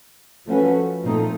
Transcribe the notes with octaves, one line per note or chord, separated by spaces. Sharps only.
F3 A3 C#4 F#4 B4
A#2 F3 A3 C4 D#4